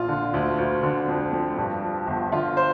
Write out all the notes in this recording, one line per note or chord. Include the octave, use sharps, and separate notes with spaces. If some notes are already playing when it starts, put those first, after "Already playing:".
Already playing: A#1 F4
D3
D2
D2
D3
F2
F2
G2
F3
G1
D3 F4
C5